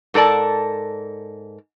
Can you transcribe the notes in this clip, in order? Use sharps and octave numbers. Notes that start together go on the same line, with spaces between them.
G#2 A4 A#4 D5 A5